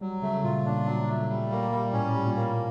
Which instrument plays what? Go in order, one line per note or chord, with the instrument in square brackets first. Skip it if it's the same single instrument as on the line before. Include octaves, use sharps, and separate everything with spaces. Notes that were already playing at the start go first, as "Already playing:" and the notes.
[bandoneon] F#3 [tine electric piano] G3
[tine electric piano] C#3 [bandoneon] A3
[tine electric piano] A#2 [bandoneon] F4
[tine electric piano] A#2 [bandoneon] D4
[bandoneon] F#3
A3
G3
A#3
G3
[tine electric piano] A2 [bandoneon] C#4
[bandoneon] G3
[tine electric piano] A#2
[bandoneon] A#3